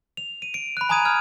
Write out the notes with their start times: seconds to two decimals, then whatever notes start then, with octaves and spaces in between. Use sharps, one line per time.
0.17 F7
0.42 D#7
0.54 D7
0.77 B5 F#6
0.89 G#5 A#5 B5 D#6 G#6 D#7
1.05 F6 G#6